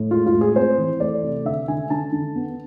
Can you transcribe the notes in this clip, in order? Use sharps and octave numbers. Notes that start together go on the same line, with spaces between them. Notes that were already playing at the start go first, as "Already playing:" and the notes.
Already playing: A2
G#3 F4
F4
A2
G#4
C4 C5
E3
A3 D5
C3
D3 E5
D3 G#5
D3 A5
D3
B3